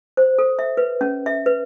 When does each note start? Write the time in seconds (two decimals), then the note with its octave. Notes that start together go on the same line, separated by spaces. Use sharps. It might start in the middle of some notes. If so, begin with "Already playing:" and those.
0.17 C5
0.38 A4
0.59 E5
0.77 B4
1.01 C#4
1.26 E5
1.46 B4